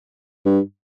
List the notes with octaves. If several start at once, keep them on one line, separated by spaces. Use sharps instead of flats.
G2